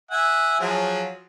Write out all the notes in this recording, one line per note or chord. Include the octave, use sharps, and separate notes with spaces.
E5 F#5 G#5
F3 F#3 G#4